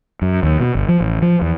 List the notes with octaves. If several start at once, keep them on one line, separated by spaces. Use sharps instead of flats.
F#2
D#2
B2
G1
F3
A1
F3
E2